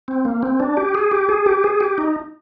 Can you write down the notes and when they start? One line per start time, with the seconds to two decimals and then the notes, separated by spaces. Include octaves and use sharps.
0.08 C4
0.25 A#3
0.43 C4
0.60 D4
0.77 G4
0.95 G#4
1.11 G4
1.29 G#4
1.46 G4
1.64 G#4
1.80 G4
1.98 D#4